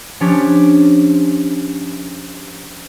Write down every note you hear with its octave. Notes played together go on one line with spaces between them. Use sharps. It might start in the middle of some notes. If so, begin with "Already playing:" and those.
F3 C#4 D4 G4 D6 B6